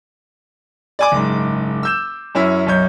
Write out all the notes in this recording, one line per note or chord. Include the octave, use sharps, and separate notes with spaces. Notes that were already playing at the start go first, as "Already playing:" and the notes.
D5 G#5 D6
F#1 G#2
E6 G6 E7
F#2 C#4 E4
B1 F#2 C#5 G6